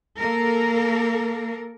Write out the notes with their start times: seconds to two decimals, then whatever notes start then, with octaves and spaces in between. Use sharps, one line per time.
0.19 A#3 A4 A#4